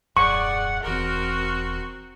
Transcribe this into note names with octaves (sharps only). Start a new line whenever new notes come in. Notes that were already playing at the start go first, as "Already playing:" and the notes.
D#1 F#2 G#4 D5 F#5 C#6
E1 E3 C4 F#4 A#4